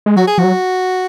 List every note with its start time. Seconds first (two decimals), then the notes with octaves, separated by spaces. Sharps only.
0.06 G#3
0.16 F#3 F#4
0.27 G#4
0.38 F3 F#4
0.44 F#3